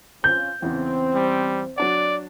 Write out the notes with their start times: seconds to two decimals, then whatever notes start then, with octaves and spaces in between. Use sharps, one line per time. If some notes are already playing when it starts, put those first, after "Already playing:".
0.24 C#4 F4 C5 G6
0.62 E2 C#3 E3 C4
1.15 G3
1.77 F#3 D4 D5 F#5